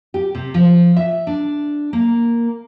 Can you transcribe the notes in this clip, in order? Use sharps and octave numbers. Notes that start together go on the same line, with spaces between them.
G4
C3
F3
E5
D4
A#3